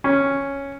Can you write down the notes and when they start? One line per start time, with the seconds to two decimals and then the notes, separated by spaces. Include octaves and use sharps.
0.04 C#4